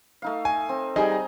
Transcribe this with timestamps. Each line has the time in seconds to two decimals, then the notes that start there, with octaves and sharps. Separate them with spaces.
0.22 A3 D#4 F5
0.45 G#5
0.69 C4
0.96 G3 D#4 G#4 D#5 G#5
1.12 A#5